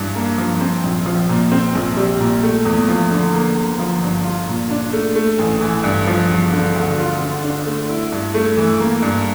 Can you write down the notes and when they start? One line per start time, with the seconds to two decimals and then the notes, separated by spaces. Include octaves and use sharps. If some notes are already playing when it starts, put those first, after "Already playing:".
Already playing: G2 E3 D4
0.15 A#3
0.38 F3
0.61 C4
0.83 A#1
1.06 F3
1.29 A#2
1.52 C4
1.75 A#1
1.97 G3
2.20 A#2
2.43 A3
2.65 E2
2.88 F3
3.11 D3
3.34 A#3
3.57 G1
3.79 F3
4.02 G2
4.24 F4
4.47 A#2
4.71 D4
4.93 A3
5.15 A3
5.39 A1
5.61 E3
5.83 G2
6.07 F3
6.30 E1
6.52 D3
6.75 D2
6.98 F4
7.21 D3
7.44 D4
7.66 A3
7.89 E4
8.12 G2
8.34 A3
8.57 E3
8.80 A#3
9.02 G2